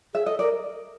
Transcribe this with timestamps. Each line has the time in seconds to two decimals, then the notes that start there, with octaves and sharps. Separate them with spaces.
0.14 G#4 E5
0.26 A4 D#5
0.39 A#4 D5